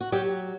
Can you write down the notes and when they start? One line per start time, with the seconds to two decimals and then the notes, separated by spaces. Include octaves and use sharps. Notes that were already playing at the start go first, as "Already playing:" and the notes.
0.01 F#4
0.12 F#3 G4